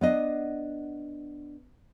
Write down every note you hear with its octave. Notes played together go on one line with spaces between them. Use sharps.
B3 D4 D#5